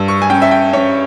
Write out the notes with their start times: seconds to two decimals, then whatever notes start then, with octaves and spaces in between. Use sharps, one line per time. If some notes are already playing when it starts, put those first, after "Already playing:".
Already playing: G2 E6
0.08 C#6
0.22 G#5
0.30 C#4 G5
0.42 E5
0.51 G5
0.73 C#4 C#5